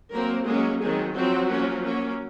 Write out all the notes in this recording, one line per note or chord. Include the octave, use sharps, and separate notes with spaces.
F#3 A#3 C4 A#4
F#3 G#3 A#3 C#4 G#4
D#3 F#3 G#3 C4 G#4
F3 F#3 C4 F#4
F3 A#3 C#4
F#3 A#3 C#4